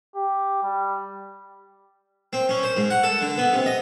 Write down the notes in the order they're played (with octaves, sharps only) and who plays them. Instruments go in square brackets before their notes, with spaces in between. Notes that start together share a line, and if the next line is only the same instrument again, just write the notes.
[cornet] G4
G3
[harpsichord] C4
C#4
C5
G#2
F#5
A4
D3
B3
C3
D#5